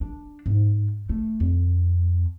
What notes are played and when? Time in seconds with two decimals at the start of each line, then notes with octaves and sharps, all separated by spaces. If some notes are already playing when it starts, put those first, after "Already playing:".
0.01 D4
0.46 G#2
1.09 A3
1.40 F2